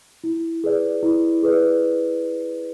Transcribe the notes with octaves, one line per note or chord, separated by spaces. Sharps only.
E4
G#4 B4 D5
E4
G#4 B4 D5